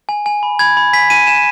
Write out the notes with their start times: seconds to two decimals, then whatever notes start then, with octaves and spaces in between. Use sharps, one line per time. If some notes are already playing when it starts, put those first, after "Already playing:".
0.09 G#5
0.26 G#5
0.43 B5
0.59 B5 G#6
0.77 B5
0.93 G#5 B6
1.10 G#5 D#7
1.27 G#5 E7